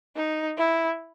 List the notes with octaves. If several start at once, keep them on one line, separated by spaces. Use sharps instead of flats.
D#4
E4